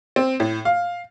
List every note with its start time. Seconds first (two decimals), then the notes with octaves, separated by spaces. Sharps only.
0.16 C4
0.40 A2
0.65 F5